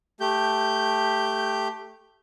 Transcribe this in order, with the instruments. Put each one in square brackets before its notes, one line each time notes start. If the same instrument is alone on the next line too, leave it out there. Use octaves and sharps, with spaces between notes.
[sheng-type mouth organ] A3 G4 G6